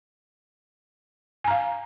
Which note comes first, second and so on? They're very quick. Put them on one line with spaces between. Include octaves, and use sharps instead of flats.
G#5 A#5 F5